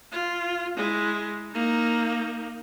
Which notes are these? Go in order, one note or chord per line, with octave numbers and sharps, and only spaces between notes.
F4
G#3 E4
A#3 D#4